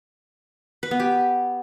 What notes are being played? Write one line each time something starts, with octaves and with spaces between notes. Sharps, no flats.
B4
B3
G4